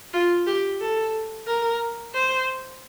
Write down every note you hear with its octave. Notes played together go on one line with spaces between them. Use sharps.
F4
G4
A4
A#4
C5